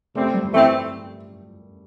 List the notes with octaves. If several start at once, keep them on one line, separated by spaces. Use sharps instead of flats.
C3 G3 A3 C4
G3
E3 A3 C4 G4